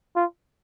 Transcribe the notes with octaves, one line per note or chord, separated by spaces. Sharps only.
F4